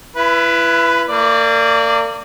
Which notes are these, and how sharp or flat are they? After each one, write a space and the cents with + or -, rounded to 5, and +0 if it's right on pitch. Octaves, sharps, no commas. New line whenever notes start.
E4 +30 B4 +0
A#3 -35 D5 +0